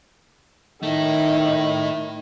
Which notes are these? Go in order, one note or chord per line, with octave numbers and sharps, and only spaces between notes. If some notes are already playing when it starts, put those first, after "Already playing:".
D#3 A3 E4